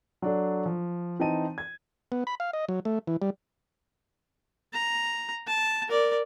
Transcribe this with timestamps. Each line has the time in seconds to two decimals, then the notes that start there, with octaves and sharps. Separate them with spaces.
0.22 F#3 D4 A4
0.66 F3
1.20 E3 C4 D#4 A5 D#7
1.58 G#6
2.12 B3
2.27 B5
2.40 F5
2.53 D#5
2.69 F#3
2.85 A3
3.07 E3
3.22 G3
4.74 A#5
5.47 A5
5.89 A#4 D5